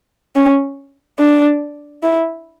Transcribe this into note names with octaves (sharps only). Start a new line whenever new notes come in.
C#4
D4
E4